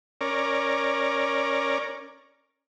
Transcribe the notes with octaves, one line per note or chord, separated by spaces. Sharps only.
C#4 A#4 D5